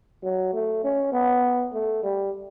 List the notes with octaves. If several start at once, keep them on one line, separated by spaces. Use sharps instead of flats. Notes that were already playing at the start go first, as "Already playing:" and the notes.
F#3
A3
C#4
B3
A3
G3